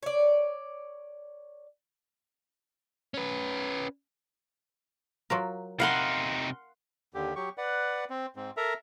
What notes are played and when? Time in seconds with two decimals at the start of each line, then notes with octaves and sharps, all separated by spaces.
0.03 C#5 D5
3.14 C#4 B4
5.30 F#3 F4 A#4
5.80 C3 D#4 E4 A#4 F5 F#5 C6
7.14 D#2 D3 G4
7.36 F#3 G4 C#6
7.58 B4 D5 F#5
8.10 C4
8.36 G#2 C4
8.57 A4 A#4 E5 A#5